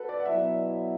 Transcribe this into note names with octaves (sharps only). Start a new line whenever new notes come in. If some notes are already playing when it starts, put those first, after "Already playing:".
Already playing: F#4 A4 B4
D5
F#5
B2 F#3 B3 E4 D5 E5